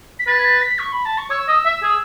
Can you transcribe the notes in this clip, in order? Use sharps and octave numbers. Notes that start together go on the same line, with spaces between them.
B6
B4 A6
G#6
A6
B6
C#6
B5
A5
C#6
C#5 E6
D#5
E5
G#4